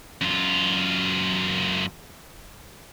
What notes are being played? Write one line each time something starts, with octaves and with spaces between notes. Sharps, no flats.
F#2 F4